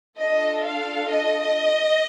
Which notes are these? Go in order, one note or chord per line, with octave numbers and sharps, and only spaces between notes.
D4 F4 A4 D#5
F5
D#5